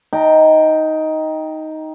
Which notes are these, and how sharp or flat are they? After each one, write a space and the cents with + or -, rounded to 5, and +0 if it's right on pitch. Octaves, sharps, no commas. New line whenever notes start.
D#4 +10 G5 +0 A#5 -45